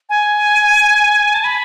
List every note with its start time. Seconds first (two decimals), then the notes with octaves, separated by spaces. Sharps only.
0.09 G#5
1.34 A5
1.44 B5